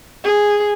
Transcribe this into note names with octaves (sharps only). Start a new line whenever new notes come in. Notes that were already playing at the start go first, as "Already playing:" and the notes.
G#4